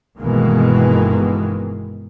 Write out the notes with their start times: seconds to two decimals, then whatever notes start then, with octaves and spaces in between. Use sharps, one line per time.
0.19 G1 B2 D#3 E3 G#3 A#3